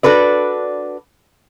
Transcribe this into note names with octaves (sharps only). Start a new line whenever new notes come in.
D4 F#4 A4 B4 D5